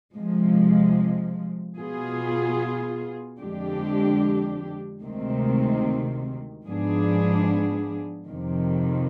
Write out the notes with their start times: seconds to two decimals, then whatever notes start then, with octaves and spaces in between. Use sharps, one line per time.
0.14 C3 F3 G#3
1.77 B2 B3 F4 G#4
3.39 F2 D3 G#3 D4 G4
5.02 D2 C3 D#3 G#3 C4
6.65 G#2 F3 B3 D4 G#4
8.27 F2 C3 D#3